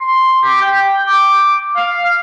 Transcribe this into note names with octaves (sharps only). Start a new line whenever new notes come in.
C6
G4
G5
D6
F5
F5